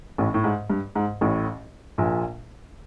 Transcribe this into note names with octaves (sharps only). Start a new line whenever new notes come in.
A1 A2
A2
G#2
G2
G#2
A1 A2
A#1 A#2